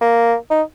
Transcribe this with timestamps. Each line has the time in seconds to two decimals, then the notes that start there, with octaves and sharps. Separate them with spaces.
0.01 A#3
0.50 D#4